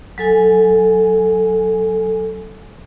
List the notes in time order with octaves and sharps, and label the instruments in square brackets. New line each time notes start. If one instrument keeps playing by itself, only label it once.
[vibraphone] F#3 A4 G#5